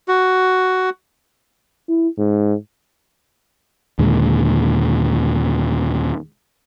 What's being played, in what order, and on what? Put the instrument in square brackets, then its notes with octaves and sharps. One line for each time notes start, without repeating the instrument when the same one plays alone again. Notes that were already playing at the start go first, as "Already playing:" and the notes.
[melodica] F#4
[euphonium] E4
G#2
[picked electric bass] D#2 A#2 D3 G#3